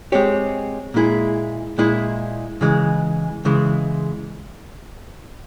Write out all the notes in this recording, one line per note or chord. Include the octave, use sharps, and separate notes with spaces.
G#3 C4 G4 C#5
A#2 G#3 E4 G#4
A#2 G#3 E4 G#4
C#3 E3 G#3
C#3 E3 G#3